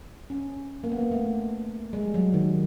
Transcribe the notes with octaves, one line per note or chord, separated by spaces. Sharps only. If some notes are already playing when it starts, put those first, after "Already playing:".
C#4
A#3
B3
A#3
A3
G#3
G3
F#3
D#3